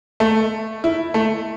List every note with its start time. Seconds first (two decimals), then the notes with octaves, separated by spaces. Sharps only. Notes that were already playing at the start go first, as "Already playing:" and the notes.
0.20 A3
0.84 E4
1.14 A3